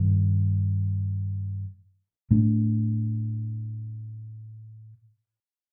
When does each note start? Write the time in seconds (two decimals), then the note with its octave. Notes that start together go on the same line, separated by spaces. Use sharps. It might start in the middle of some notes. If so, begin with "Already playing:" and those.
Already playing: G2 D#3
2.31 A2 A3 D4